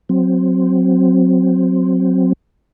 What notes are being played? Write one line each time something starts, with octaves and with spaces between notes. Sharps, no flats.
F#3 C4